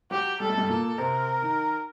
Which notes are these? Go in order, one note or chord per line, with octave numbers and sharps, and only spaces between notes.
F#3 F#4 G4
G3 A4
A3
G2 G3
A#2 A#3 A4
C3 C4 A#4
D#3 D#4